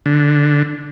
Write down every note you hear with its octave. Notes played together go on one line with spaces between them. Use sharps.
D3